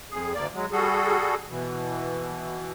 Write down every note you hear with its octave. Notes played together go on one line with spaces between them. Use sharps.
F2 G#4
D2 A#3 D5
F#3 G#3
G3 F#4 G#4 A4
B2 E3